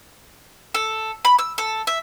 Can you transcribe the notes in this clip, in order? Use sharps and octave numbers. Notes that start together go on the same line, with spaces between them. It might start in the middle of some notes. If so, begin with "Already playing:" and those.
A4
B5
E6
A4
E5